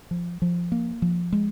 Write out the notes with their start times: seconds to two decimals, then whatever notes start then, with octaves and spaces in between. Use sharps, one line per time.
0.11 F3
0.42 F3
0.72 A#3
1.02 F3
1.32 G#3